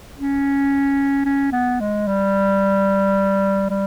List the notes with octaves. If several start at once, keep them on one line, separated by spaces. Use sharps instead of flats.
C#4
C#4
B3
G#3
G3
G3